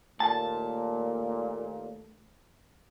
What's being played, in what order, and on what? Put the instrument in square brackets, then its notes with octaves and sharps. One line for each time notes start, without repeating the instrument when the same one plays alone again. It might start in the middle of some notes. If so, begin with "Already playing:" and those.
[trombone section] D#2 A#2 [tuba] A3 [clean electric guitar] A5